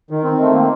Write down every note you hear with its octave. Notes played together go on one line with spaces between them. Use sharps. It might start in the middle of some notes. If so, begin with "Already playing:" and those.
D#3
C4
D#3 A3
A#3